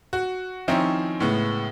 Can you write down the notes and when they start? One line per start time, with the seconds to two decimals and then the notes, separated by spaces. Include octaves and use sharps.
0.13 F#4
0.68 D#3 F3 C4 C#4 D#4 E4
1.20 A2 C#3 G#3 B3